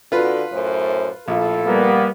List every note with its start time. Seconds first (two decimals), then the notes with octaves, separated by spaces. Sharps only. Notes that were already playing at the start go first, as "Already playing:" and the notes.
0.12 D3 F4 F#4 B4
0.51 F#2 A2 C5
1.28 A#1 A2 F4 A4
1.66 G3 A#3 B3